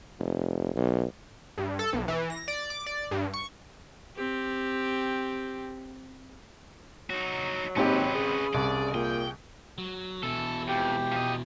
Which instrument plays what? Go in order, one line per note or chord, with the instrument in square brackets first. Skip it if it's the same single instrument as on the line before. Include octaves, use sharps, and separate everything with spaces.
[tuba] F1
B1
[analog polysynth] G2
A4
B1
E3
A#6
D5
D6
D5
G2
C#6
[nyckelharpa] C4 G4
[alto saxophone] F#3 [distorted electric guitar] D#4 F#4
[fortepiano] G#1 C4 G4 [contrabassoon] D#2 [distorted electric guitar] C#4 B4
[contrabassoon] C#3 [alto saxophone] G#4
[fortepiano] C2 [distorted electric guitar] D5
[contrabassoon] A#2 [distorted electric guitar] G5
[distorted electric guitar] F#3
[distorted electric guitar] B2 E3 [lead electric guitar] A4
[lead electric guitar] F2 [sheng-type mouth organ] G4
[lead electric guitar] F3 D#5